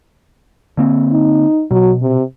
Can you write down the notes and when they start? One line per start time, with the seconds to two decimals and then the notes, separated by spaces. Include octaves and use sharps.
0.77 D3 A#3 C4
1.12 D#4
1.71 B2 F#3
2.02 C3